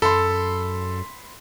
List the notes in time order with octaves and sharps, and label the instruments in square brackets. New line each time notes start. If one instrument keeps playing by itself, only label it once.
[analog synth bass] F#2 [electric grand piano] A4 [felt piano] B5 C6